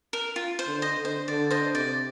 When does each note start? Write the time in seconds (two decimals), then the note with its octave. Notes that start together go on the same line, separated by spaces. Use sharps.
0.13 A#4
0.36 F4
0.59 C5
0.67 D3
0.82 C5 D#5
0.97 D3
1.05 C5
1.28 D3 D5
1.51 C5 D#5
1.75 C3 D5